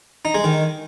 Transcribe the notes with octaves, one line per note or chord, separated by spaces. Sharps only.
D#4
G#3
D#3